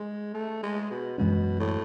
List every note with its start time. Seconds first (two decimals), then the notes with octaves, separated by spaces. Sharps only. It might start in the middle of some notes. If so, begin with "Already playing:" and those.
Already playing: G#3
0.34 A3
0.63 G#3
0.91 B2
1.18 F#2 B2 E3 G#3 C#4
1.60 A2